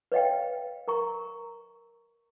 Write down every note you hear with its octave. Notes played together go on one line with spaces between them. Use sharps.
B4 C#5 D#5 F5 G5
A#4 A#5 C#6